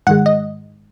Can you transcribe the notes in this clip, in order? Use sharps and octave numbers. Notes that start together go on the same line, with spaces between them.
G#2 D#3 G#3 F#5
D#5